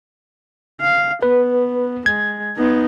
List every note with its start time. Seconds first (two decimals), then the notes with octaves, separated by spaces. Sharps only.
0.81 F5
1.22 B3 B4
2.06 G#3 G#6
2.57 B3 D#4